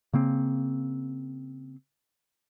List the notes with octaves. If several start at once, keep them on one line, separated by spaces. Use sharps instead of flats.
C#3 A#3 C4